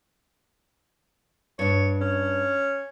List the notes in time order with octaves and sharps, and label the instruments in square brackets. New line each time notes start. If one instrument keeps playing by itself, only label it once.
[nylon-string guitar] G2 D4 [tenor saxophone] C#5
[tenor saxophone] C#4